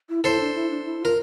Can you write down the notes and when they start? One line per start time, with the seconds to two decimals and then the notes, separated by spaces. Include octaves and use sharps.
0.09 E4
0.24 E4 A4 C5
0.40 D4
0.55 E4
0.70 D4
0.85 E4
1.00 F4 A#4